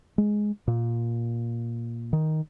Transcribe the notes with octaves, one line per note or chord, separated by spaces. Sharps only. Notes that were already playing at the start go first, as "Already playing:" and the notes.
G#3
A#2
D#3